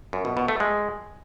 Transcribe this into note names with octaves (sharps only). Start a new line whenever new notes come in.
F#2
B2
B2
A3
G#3